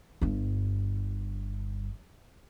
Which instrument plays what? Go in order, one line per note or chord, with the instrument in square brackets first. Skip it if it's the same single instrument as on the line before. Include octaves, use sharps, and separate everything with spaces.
[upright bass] G1 G2